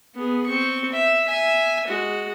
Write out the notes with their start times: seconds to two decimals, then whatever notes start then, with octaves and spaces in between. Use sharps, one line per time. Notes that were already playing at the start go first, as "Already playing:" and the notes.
0.15 B3 G#4
0.46 C4 C#6
0.93 E5
1.28 E5 G#5
1.87 G#3 F#4